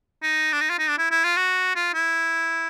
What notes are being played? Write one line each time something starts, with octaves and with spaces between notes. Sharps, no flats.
D#4
D4
D#4
F4
D#4
D4
E4
E4
F4
F#4
F4
E4